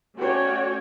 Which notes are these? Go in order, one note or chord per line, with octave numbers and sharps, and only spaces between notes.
A3 C#4 F#4 C#5 D5 G5